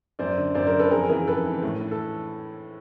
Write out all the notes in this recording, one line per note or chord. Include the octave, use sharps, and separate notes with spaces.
F#2 C5 D5
D3
F#2 C5 D5
A#4 C5
D3
A4 B4
F2 G#4 A#4
C#3 E3 G#4 A#4
F2 A4 B4
C#3 E3
A2
E3
A4